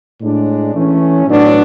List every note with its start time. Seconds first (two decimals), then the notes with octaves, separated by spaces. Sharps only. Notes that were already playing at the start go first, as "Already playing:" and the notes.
0.21 A2 G#3 D4
0.74 E3 A3 C#4
1.27 A2 F#3 B3 D4